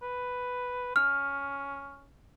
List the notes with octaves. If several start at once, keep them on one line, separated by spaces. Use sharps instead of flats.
B4
C#4 F6